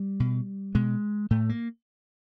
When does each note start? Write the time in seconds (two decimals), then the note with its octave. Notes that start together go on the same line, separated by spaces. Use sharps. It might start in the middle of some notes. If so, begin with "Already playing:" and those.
Already playing: G3
0.20 B2
0.75 B2 G#3
1.31 A2 A3
1.49 A#3